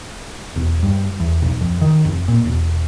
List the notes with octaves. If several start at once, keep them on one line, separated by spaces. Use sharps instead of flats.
E1
G2
E2
B1
F2
D#3
F1
A#2
E1